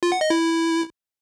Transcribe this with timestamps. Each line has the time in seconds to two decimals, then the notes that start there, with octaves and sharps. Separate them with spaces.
0.03 F4
0.12 F#5
0.21 D#5
0.30 E4